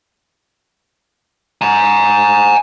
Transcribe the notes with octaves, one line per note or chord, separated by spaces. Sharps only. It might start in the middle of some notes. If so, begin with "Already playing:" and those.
G#5 A#5